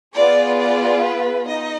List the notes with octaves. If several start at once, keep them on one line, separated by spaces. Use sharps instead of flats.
B3 F4 G#4 D5
D5
B4
D#4 D#5